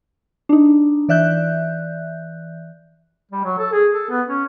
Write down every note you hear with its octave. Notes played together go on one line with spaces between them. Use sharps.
D4 D#4
E3 D5 E5 F#6 G6
G3
F#3
A4
G#4
A4
B3
C#4